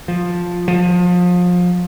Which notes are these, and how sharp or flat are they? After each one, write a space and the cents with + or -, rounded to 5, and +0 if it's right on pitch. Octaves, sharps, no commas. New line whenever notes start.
F3 +10
F3 +30